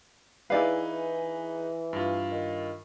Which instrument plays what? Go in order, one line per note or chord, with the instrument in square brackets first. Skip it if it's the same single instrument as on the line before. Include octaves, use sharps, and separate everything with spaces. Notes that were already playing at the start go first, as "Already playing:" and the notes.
[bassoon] E3 [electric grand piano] D#4 G#4 B4 [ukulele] E4 D5 F5
[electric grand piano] G2 F4
[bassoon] D#3